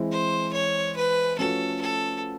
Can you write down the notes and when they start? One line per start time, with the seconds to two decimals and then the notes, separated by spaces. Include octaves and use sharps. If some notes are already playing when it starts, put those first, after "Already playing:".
Already playing: E3 G#3 C4 E4
0.12 C5
0.53 C#5
0.96 B4
1.39 F3 A3 C#4 F#4 A4 B4
1.81 A4